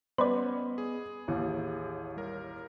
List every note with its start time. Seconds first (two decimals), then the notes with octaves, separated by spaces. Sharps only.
0.18 G3 B3 C#4 B4 C5 D5 D#5 B5
0.78 G#4
1.28 A1 D#2 E4
2.17 G3 A#4